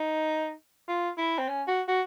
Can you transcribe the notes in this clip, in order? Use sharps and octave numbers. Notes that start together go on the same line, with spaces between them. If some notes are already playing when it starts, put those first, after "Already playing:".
Already playing: D#4
F4
E4
C4
C#4
F#4
F#4